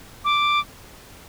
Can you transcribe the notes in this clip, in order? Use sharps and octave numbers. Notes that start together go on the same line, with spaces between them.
D6